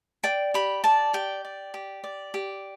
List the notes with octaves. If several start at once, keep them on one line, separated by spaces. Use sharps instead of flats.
D5 G5
G4 B5
D5 A5
G4 G5
D5
G4
D5
G4